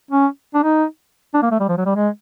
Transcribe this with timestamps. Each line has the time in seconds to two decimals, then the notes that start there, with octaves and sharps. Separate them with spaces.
0.11 C#4
0.54 D4
0.63 D#4
1.34 D4
1.42 A#3
1.51 A3
1.60 G3
1.69 F3
1.77 F#3
1.86 G3
1.95 G#3